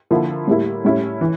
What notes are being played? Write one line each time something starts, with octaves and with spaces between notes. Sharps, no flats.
D3 F3 A#3 E4
A2 G3 A#3 E4
A2 G3 C#4 E4
E3